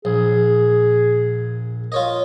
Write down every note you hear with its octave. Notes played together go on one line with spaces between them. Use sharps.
A#1 G#4
F4 A#4 C#5 D#5